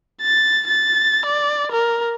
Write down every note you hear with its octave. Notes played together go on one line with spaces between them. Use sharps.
A6
A6
D5
A#4